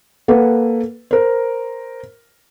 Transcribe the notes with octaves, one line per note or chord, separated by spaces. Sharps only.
A#3 A4 B4 F#5
A#4 C5